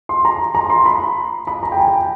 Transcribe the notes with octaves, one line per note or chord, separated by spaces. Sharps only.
C6
A#5
A#5
C6
B5
B5
A#5
G5
G#5
G5